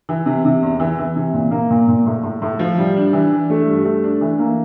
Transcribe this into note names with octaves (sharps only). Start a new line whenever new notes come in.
E3
C3
C3
E2
E3
E3
C3
A#2
A#3
A#2
A#2
A2
A2
A2
F3
G3
D4
E3
D4
A3
G2
A3
D4
E3
A#3